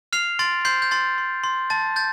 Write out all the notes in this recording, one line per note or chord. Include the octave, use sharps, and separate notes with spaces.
F6 C7 F7
C6 A6 D7
C6 G6 C7
G6
C6 A6
C6
C6
A5 A6
G6 A6